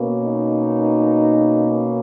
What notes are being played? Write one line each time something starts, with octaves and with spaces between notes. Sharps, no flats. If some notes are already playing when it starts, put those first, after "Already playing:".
Already playing: B2 A#3 C#4
D#4